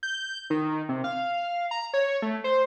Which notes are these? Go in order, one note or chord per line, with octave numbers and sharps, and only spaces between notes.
G6
D#3
C3
F5
A#5
C#5
A3
C5